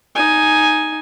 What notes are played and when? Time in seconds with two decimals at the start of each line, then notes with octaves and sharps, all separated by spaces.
0.15 D#4 G#5